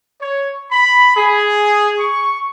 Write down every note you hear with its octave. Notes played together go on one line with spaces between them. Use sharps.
C#5
B5
G#4
C#6